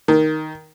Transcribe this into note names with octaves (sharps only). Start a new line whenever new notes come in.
D#3